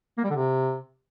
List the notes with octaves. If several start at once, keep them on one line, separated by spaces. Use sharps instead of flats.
A#3
G3
D3
C3